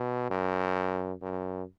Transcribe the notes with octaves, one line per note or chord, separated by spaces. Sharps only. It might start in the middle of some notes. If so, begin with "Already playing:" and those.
Already playing: B2
F#2
F#2